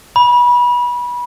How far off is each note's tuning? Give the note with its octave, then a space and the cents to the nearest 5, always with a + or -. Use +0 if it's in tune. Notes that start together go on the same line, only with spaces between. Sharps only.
B5 -25